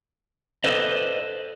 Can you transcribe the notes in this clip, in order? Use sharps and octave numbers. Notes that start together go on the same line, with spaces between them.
A4 B4 C5 D5 D#5